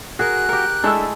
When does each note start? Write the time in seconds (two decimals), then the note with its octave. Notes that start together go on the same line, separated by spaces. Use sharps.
0.19 F#4 G#4 A#4 F#6
0.49 G4 A#4
0.84 G#3 A3 D4 E4 A4 E6